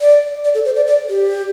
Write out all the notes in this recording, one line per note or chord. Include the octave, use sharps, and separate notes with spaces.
D5
D5
A4
C5
D5
D5
G4